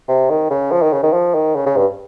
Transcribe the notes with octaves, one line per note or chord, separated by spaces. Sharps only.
C3
D#3
C#3
F3
D#3
C#3
D#3
F3
D#3
C#3
C#3
G2